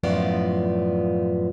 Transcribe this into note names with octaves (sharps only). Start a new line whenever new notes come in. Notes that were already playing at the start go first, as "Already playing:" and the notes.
F#2 A2 F3 B3 F4 D5